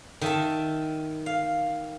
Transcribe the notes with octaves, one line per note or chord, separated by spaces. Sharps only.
D#3 E5 A5
F5